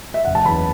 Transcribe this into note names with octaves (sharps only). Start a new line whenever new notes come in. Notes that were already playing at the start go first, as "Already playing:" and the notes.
E5
F#1 F#5
A5
E2 C#3 E3 B5